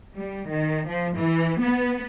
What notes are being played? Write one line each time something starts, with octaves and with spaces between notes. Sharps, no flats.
G3
D#3
F3
E3
B3